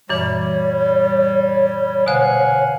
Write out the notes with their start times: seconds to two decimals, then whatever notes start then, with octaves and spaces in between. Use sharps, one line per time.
0.09 F#2 A#2 E3 G3 C#5
2.06 B2 D3 C5 F5 F#5 G#5